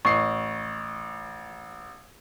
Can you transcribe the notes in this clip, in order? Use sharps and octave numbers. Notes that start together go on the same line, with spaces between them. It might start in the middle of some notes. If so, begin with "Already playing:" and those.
A1 C#6 C7